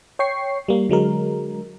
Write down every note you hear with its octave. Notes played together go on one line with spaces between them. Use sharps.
C#5 G5 C#6 C7
G3 A#3
D3 F#3 G#3 A#4